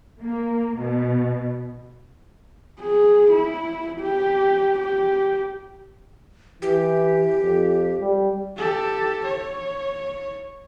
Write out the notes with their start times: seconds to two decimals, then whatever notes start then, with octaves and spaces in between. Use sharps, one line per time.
0.21 A#3
0.80 B2
2.80 G#4
3.31 E4
4.01 G4
4.79 G4
6.62 E3 G4
7.40 F2
8.01 G3
8.56 G4 A4
9.24 C#5